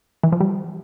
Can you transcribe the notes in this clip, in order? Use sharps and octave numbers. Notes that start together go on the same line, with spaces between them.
E3
F3
G3